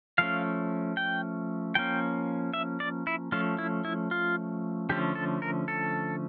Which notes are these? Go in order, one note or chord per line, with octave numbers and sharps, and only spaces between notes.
F3 A3 C#4 F5
G5
F3 A#3 C#4 G5
E5
D5
E4
F3 A3 C#4 F4
E4
E4
F4
D3 F3 A3 C#4 G4
A4
A#4
A4